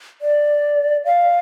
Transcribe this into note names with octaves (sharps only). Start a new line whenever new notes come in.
D5
F5